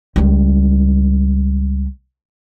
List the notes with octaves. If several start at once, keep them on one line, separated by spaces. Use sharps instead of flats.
C#2 G3